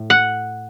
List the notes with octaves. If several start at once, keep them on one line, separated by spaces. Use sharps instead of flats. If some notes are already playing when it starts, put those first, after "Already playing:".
Already playing: A2
F#5